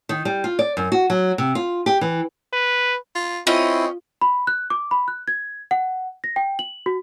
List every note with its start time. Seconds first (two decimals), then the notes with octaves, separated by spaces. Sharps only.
0.09 D#3
0.25 G3
0.44 F4
0.59 D5
0.77 F#2
0.92 F#4
1.10 F#3
1.38 C3
1.55 F4
1.86 G4
2.01 E3
2.53 B4
3.15 F4
3.47 C4 C#4 E4 F4 D#5
4.21 B5
4.47 F#6
4.70 D6
4.91 B5
5.08 F#6
5.28 G#6
5.71 F#5
6.24 A#6
6.36 G5
6.59 F#7
6.86 F#4